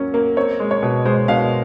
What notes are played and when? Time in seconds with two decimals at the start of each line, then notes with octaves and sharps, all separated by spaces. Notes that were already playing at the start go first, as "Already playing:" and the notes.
Already playing: F#3 A#3 C#4
0.14 A#3
0.37 C4 C#5
0.60 G#3
0.71 C#5
0.83 B2
1.05 G#3 C5
1.28 B2 F5